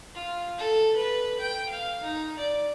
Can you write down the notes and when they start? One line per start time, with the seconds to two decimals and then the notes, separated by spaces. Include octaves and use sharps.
0.15 F4
0.58 A4
0.96 B4
1.39 G5
1.69 F5
2.03 D#4
2.38 D5